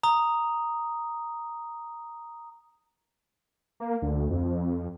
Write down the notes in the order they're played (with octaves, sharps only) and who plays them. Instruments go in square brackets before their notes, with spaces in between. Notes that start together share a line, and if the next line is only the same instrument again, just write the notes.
[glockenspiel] A#5 D#6
[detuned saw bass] A#3
D2
F2
F2